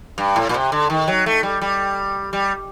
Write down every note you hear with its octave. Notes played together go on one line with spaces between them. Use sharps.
G2
A2
A#2
C3
D3
D#3
F#3
A3
G3
G3
G3